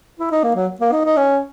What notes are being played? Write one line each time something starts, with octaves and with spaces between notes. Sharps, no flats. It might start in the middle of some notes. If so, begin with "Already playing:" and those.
E4
D#4
A#3
F#3
A#3
D#4
D#4
C#4